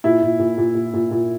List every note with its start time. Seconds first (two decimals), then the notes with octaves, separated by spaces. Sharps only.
0.04 A#2 E4
0.22 A#2
0.39 A#2
0.58 A#2
0.75 A#2
0.94 A#2
1.11 A#2